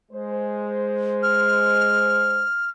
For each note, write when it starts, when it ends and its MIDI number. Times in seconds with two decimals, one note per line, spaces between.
0.12 2.45 56
0.12 2.45 72
1.23 2.69 89